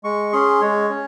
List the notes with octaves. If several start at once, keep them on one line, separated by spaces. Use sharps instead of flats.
G#3 C#6
C#4 G#4 C6
G#3 C#5
C#4